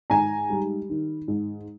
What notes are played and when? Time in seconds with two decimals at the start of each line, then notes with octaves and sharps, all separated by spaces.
0.10 G#2 G#5 A#5
0.50 G3
0.89 D#3
1.28 G#2